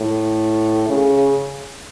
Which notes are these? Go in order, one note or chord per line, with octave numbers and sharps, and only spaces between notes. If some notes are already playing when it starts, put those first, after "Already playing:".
Already playing: A2
C#3